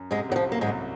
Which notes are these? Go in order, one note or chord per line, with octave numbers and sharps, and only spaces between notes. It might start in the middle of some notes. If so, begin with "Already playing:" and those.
Already playing: F#2
G#2 C3 G#3
C2 F#3
F3
F#3 A#3
G#2 G#3
C2